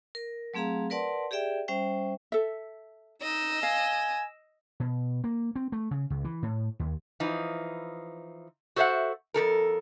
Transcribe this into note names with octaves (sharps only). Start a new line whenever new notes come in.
A#4
F#3 A3 C4 G#4 F5 A#5
A#4 B4 D5 F#5 A5 C6
G4 G#4 D5 E5 G5
G3 C#4 C5 E5 G5
A4 E5
D#4 D#5 E6
F5 G#5
B2
A#3
C4
A3
C#3
C#2
E3
A2
D#2
E3 F3 D#4
F#4 A4 C5 D#5 E5 F#5
F2 A#2 A4 A#4